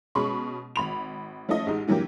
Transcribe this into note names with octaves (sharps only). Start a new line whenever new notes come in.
B2 G#3 C#4 B5 C#6
G#1 B5 F7
F3 A3 C#4 E4 D#5
A1 G#3 D#4
D3 E3 F#3 A#3 G4